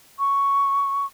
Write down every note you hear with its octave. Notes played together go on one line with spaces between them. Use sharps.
C#6